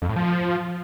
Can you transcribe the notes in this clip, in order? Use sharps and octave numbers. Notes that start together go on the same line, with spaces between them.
F2
A2
F3